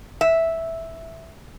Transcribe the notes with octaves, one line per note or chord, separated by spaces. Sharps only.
E5